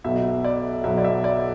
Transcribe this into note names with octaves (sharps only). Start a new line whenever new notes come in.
B1 B2 F#3 E5
D5
B1 B2 F#3 E5
D5
E5
D5